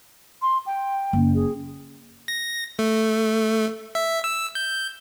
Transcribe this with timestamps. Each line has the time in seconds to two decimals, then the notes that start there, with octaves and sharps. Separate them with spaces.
0.42 C6
0.66 G5
1.13 F#1
1.35 G#4
2.28 A#6
2.79 A3
3.95 E5
4.24 E6
4.55 G6